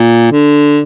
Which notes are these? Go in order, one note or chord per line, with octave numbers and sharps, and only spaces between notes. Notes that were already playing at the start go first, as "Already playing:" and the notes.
Already playing: A#2
D3